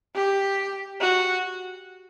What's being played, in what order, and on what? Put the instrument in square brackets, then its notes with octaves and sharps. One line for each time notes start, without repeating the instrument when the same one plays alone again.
[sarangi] G4
F#4